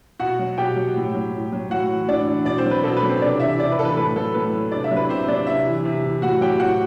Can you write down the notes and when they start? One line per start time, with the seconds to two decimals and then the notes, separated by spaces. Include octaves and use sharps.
0.19 B2 F#4 F#5
0.39 F#3
0.58 B2 G4 G5
0.76 F#3
0.96 A2
1.14 F#3
1.32 A2
1.52 F#3
1.70 A2 F#4 F#5
1.90 E3
2.08 A2 D4 D5
2.27 E3
2.45 B2 D4 D5
2.58 C4 C5
2.65 F#3
2.71 B4
2.83 B2 A4
2.96 B4
3.03 F#3
3.09 C4 C5
3.22 C3 D4 D5
3.40 E3 E4 E5
3.58 C3 D4 D5
3.72 B4
3.77 E3 A4
3.85 B4
3.97 A2 B4
4.16 F#3 A4
4.34 A2 B4
4.53 F#3
4.72 C3 D4 D5
4.84 E4 E5
4.91 F#3
4.96 B4
5.09 C3 C4 C5
5.28 F#3 D4 D5
5.47 C3 E4 E5
5.66 E3
5.85 C3
6.04 E3
6.22 A2 F#4 F#5
6.41 F#3 G4 G5
6.60 A2 F#4 F#5